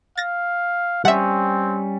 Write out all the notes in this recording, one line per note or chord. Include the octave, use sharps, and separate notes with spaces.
F5 A6 A#6
G3 C4 C#4 E5 F#5